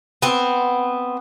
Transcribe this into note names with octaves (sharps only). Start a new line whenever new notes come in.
B3 C4